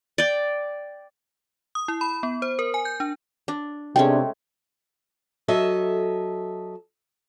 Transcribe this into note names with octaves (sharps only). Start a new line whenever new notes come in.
D5 G5
D#6
E4
B5
B3
C5
A#4
G#5
G6
D4
D4
C3 G#3 A3 C#4 D4 G#4 G5
F#3 A4 D#5 E5